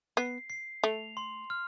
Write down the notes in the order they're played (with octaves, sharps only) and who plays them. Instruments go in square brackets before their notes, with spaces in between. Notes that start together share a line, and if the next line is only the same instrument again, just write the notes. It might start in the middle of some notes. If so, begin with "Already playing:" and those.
[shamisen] B3 [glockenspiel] C7
[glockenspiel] C7
[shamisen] A3 [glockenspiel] F7
[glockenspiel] C6
F6